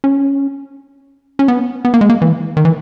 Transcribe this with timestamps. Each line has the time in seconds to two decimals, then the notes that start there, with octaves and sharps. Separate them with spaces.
0.04 C#4
1.39 C#4
1.48 B3
1.85 B3
1.94 A#3
2.01 G#3
2.10 A#3
2.22 E3
2.57 D#3
2.65 E3